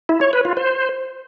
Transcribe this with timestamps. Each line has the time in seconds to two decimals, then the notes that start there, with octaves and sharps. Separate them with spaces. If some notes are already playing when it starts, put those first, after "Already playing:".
0.09 E4
0.21 C#5
0.33 B4
0.45 F4
0.57 C5